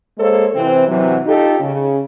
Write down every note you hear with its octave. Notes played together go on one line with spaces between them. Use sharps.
G#3 A#3 A4 C5 C#5
C3 E3 C4 E4 C5
C3 E3 F#3
D#4 F4 G4 A4
C#3